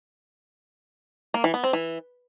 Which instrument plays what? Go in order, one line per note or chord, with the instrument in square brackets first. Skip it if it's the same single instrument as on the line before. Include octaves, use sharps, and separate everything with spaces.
[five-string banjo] A#3
E3
B3
C4
E3